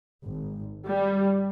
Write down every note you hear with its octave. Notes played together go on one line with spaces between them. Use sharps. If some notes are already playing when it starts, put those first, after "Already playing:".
G#1
G3